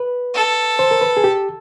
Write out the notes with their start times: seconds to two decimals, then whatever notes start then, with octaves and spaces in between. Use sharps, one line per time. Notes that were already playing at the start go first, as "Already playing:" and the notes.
Already playing: B4
0.35 A4
0.79 C5
0.91 A#4
1.02 B4
1.17 G#4
1.24 G4